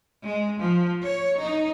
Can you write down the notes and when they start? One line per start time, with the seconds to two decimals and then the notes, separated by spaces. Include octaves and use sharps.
0.25 G#3
0.60 F3
1.03 C#5
1.41 D#4